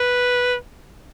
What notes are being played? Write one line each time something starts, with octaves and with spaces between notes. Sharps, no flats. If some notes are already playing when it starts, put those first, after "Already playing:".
Already playing: B4